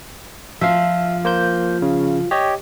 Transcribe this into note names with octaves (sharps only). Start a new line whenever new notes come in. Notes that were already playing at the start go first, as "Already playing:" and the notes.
F3 E5 F5
A#3 C5 G6
C#3
G4 C#5 D#5